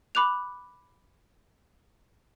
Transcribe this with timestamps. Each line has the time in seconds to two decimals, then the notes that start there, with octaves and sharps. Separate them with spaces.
0.15 B5 D6 F#6 F7